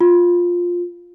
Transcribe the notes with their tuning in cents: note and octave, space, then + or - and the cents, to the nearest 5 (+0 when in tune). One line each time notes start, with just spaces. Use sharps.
F4 +10